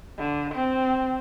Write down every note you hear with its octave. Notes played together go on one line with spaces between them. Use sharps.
D3
C4